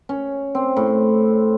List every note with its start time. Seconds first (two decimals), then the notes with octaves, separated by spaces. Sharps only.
0.09 C#4
0.55 C4
0.77 A2